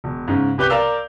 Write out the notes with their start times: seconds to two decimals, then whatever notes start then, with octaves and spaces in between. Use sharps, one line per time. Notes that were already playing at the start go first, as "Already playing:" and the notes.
0.04 E1
0.28 G#2 C#3
0.58 C2 G4 B4 G6 G7
0.70 A#4 D5 F5 E6